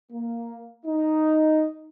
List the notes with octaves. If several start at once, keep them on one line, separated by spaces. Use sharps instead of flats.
A#3
D#4